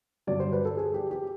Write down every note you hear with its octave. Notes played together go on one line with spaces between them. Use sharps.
G2 D3 F#3 D5
C5
B4
A4
G#4
G4
G4